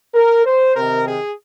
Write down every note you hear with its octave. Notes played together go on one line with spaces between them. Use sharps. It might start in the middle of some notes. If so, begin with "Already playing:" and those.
A#4
C5
C3 D#3 A#4
G#4